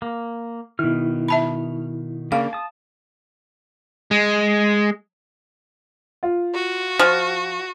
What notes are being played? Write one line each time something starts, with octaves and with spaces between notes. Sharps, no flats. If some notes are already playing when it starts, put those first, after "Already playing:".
A#3
B2 D#3 E4 F6
E5 A5 B5
C#3 A#3 D4 F5
A5 D#6
G#3
F4
F#4
F3